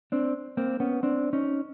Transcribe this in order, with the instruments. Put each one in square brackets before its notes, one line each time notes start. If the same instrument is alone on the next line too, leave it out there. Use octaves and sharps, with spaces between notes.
[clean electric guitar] C4 D4
A#3 C4
B3 C#4
C4 D4
C#4 D#4